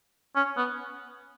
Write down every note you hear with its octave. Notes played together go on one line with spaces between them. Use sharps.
C#4
B3